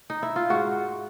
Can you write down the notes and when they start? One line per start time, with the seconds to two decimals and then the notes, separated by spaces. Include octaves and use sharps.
0.10 D#4
0.23 E4
0.36 F4
0.50 G#2 F#4